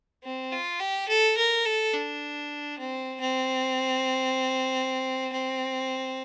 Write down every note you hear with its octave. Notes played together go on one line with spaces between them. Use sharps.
C4
F4
G4
A4
A#4
A4
D4
C4
C4
C4